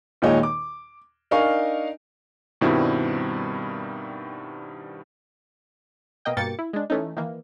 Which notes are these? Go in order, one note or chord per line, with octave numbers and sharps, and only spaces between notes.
D#2 A#2 G#3 D#4 C#5
D6
D4 D#4 A#4 F5 G#5 C#6
G2 B2 D#3 G3 C4 E4
B2 A#3 D#5 G5
G2 B2 A#3 G5 A6 C#7
E4
G#3 D4
E3 A3 C#4 D#4
D#3 E3 A#3